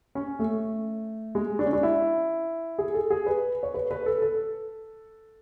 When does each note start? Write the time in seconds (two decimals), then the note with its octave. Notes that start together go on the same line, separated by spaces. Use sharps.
0.15 C#4
0.39 A3
1.35 G#3
1.59 D4
1.66 C#4
1.73 D4
1.83 E4
2.79 G#4
2.94 A4
3.10 G#4
3.26 B4
3.63 C#5
3.74 B4
3.91 B4
4.06 A4
4.22 A4